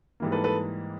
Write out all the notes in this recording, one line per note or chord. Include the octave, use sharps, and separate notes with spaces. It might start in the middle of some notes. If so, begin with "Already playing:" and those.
G#2 E3 G3 A#3
A4 B4
A4 B4